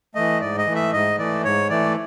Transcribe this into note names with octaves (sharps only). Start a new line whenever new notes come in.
E3 A3 D#5
G#2 D5
D#5
E3 A3
E5
G#2 D#5
E3 A3 D5
G#2 C#5
E3 A3 D5